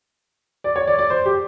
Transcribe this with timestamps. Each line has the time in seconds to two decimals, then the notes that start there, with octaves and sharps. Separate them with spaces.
0.64 D5
0.76 C#5
0.87 D5
0.99 D5
1.10 C5
1.26 G4